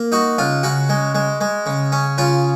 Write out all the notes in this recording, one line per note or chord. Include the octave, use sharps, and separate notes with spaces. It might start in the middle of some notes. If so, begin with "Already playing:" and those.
Already playing: A#3
D#4 F#4
C#2 F4
C#3 F#4
G#3
G#3
G#3
C#3
C#4
C#3 F4